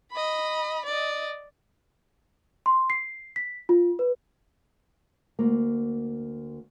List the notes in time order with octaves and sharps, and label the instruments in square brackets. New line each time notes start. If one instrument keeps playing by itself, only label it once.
[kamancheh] D#5 B5
D5 D#5
[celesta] C6
C7
B6
F4
B4
[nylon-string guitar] D2 A#3